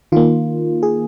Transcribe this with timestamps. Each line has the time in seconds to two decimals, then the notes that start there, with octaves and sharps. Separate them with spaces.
0.12 D#3 A#3 F4
0.83 G#4